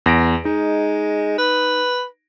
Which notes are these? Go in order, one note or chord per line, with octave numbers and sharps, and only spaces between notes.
E2 A#6 D7
G#3 D#4
B4